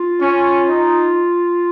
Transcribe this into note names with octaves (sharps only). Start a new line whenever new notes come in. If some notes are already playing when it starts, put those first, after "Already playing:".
Already playing: F4
C#4
D#4